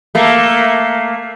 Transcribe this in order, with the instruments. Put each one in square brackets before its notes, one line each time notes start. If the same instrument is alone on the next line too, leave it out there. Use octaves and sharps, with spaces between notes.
[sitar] A3 A#3